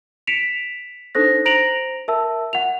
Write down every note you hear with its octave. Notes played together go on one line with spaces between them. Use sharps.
B6 C#7 D7 E7 F7
D4 D#4 A4 C5 A#6
C5 A#5 A#6 D7 F7 F#7
A#4 E5 A5 E6
F#5 F7